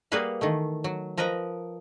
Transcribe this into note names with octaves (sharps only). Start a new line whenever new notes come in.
G3 A#3 F#4 G#4 B4 F5
D#3 E3 A3
F#3
F3 A#4 B4 D#5 A#5